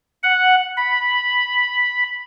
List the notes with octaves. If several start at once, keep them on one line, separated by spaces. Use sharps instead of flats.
F#5
B5